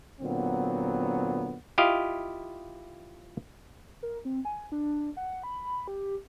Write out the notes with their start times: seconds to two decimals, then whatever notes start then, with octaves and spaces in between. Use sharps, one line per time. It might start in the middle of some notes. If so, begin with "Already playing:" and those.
0.21 A#2 D3 F#3 B3 C4
1.78 E4 F4 G4 D#5 F5
4.03 A#4
4.25 C4
4.45 G#5
4.72 D4
5.17 F#5
5.43 B5
5.88 G4